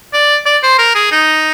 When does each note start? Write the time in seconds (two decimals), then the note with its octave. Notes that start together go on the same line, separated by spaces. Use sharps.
0.13 D5
0.46 D5
0.63 C5
0.79 A#4
0.95 G#4
1.12 D#4